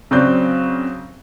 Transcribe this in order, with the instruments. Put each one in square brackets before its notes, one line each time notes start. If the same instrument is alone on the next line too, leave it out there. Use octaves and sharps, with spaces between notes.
[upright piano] C#3 F#3 C4 D5 G6